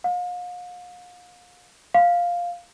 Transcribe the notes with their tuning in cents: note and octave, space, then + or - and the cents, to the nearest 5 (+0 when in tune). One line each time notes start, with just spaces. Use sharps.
F5 +40
F5 +5